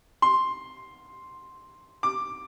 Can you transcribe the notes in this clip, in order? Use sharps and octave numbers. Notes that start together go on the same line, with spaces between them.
C6
D6